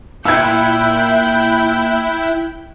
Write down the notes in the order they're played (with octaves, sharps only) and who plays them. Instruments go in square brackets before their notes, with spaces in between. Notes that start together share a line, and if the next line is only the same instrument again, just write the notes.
[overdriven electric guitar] A#2 [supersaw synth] E4 [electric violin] G5 F#6 [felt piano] E6 G#6